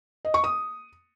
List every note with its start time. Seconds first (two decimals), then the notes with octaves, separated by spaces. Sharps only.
0.25 D#5
0.34 C#6
0.44 D#6